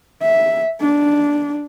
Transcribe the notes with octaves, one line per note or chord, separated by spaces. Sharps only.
E5
D4